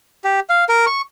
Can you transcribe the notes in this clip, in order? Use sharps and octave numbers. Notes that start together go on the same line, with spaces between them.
G4
F5
A#4
C#6